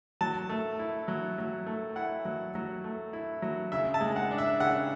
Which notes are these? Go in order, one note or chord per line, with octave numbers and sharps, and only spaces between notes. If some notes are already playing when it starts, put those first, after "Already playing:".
F#3 A5
A3
E4
F#3
F#3
A3
E4 F#5
F#3
F#3
A3
E4
F#3
C#3 E5
A5
G#3
F#5
D4
E5
C#3 F#5